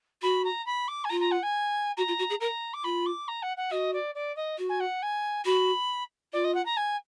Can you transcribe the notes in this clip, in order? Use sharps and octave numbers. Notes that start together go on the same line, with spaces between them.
F#4 B5
A#5
B5
D6
G#5
F4 A#5
A#5
F#5
G#5
F#4 A#5
F4
F#4
G#4
A#4 A#5
D6
F4 B5
D6
A#5
F#5
F#5
F#4 D#5
D5
D5
D#5
F#4
G#5
F#5
G#5
F#4 B5
F4 D5
D#5
F#5
A#5
G#5